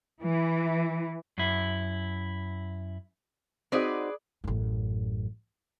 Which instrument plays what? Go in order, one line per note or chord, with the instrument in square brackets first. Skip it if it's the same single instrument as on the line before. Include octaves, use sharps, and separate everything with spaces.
[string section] E3
[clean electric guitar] F#2 E4
[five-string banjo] C4 D#4 F#4 [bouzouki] G#4 B4 D5
[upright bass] A1 F#2